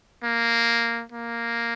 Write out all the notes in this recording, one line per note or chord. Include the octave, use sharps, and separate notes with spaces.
A#3
A#3